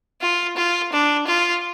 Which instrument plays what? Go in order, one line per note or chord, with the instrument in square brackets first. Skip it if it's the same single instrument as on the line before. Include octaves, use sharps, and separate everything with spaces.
[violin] F4
F4
D4
F4